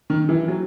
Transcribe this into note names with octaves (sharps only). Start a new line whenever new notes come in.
D#3
E3
F#3